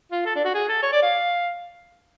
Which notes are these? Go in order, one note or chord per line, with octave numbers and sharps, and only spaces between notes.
F4
A4
D4
F#4
G#4
A4
C#5
D5
F5